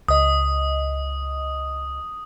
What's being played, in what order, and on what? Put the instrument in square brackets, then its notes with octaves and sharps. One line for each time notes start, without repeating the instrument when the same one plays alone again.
[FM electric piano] C#2 D#5 [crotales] D#6